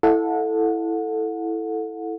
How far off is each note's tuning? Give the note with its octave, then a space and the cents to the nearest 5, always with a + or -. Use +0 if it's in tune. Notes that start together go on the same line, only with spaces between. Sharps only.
E4 +0 A4 +0 F#5 -30